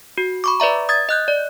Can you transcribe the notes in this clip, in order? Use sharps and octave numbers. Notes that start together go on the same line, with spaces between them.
F#4
B5 C#6 D6
B4 D5 E5 A#5
D#6 G#6 A6
D#5 F#6 G6
D5